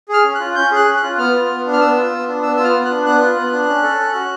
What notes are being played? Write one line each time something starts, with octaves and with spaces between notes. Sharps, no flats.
G#4 F6
C#4
F#6
F4
C#4 G6
G#4 F#6
C#4
F#6
F4
B3 F6
F4
B3
D4
F6
B3 E6
F4
B3
D4
B3 E6
F4 E6
F6
B3
F#6
D4
B3 F#6
F4
B3
D4
C#4
A4
C#4
F#4